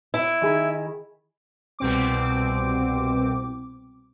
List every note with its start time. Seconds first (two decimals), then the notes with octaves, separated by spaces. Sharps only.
0.14 E4
0.41 D#3 G#4 B5
1.79 C2 B2 C4 D6